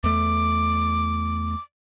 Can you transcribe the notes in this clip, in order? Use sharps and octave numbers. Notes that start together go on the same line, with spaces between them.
E2 A3 D6